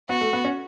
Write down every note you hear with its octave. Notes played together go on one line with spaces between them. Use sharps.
B3 F#4
A3
B3
C#4